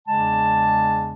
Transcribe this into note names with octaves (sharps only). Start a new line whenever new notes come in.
E2 C#3 G#3 D4 A5